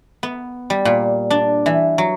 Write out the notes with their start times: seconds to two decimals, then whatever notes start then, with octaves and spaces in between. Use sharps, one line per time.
0.23 B3
0.70 G3
0.85 A#2
1.31 D4
1.66 E3
1.98 F#3